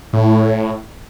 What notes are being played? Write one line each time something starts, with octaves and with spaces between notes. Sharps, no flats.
A2